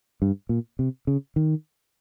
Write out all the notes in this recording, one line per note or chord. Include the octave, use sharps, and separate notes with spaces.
G2
A#2
C3
C#3
D#3